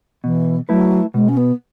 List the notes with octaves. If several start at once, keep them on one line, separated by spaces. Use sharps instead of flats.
B2 E3
F#3 A3 E4 B4
B2 G#3
C#4
B3